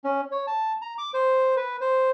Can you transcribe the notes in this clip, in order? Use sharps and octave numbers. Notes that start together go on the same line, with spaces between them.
C#4
C#5
A5
A#5
D6
C5
B4
C5